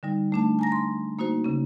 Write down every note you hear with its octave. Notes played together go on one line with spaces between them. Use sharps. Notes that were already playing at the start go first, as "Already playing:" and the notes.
D3 G3 D#4
A3 D4 A5
G#5 A#5 A#6
C6
A#3 D#4 F#4 C5
C#3 C#4